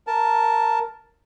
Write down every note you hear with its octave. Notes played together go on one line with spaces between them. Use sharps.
A#4 A5